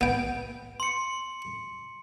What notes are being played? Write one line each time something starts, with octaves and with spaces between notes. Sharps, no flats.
B3 G5
C6 C#7